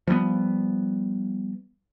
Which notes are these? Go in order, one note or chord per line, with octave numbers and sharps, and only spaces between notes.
F3 G3 A3 B3